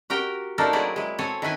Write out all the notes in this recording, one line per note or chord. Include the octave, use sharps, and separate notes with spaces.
F#4 G4 A#4 G5 A#5
A3 A#3 D4 D#4 A4 A#4
F#3 C4 E4 G#4 D5 D#5
G#3 E4
C4 A4 C#5 G#5
D#3 E4 B4 G#5